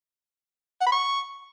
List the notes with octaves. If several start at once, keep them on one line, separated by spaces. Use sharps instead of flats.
F#5
B5
C#6